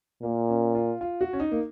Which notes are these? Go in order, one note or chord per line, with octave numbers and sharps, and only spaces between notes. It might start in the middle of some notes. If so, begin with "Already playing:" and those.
A#2 A#3
C#4
F4
F4
F#4
C#4
D#4
A#3